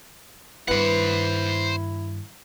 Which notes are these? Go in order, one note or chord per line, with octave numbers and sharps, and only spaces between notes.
G2 D#3 B3 E4 C5 F#5 B5